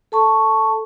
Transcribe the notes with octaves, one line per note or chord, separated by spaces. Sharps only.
A4 A5 C#6